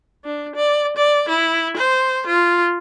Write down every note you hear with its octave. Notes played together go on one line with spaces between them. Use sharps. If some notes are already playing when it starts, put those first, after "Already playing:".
D4
D5
D5
E4
C5
F4